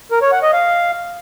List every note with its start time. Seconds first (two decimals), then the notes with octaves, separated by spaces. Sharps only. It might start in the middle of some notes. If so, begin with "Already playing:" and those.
0.11 A#4
0.22 C#5
0.32 F#5
0.42 D#5
0.53 F5